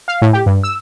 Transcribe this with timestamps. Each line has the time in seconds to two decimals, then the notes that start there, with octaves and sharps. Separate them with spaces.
0.08 F5
0.22 A2
0.33 G4
0.46 G2
0.64 E6